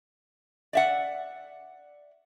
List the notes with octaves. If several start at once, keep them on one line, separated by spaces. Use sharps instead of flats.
D5 E5 F#5